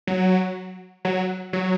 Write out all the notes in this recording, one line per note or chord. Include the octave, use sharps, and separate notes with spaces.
F#3
F#3
F#3